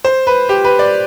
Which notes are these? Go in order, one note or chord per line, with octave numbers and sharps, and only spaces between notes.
C5
B4
G4
B4
D5